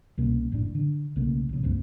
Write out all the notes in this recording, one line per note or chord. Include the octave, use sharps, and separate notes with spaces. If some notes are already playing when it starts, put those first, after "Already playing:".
C2 B2 A#3 C#4
F#1 A2 D4
D3
B1 C#3 A3 A#3
A#1 C#3
C#2 G2 A#3 C4